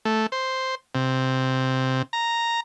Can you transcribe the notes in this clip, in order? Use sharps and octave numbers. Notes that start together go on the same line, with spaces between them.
A3
C5
C3
A#5